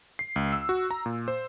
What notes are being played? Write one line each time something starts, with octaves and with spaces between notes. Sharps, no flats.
C7
C#2
E6
F#4
A#5
A#2
C5